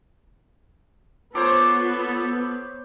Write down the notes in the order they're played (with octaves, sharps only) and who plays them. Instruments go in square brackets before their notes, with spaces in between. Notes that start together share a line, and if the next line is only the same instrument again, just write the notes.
[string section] B3 [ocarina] F4 [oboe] A4 [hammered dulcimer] C5 C#5 D6